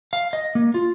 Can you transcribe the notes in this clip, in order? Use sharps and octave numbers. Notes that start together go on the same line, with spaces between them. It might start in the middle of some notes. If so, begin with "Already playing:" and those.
F5
D#5
A#3
F4